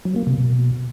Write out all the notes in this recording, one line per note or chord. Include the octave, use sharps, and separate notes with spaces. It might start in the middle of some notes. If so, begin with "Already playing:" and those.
F#3
A#3
C3
B2